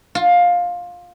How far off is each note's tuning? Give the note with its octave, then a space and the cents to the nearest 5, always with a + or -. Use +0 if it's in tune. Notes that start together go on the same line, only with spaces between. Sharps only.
F4 +15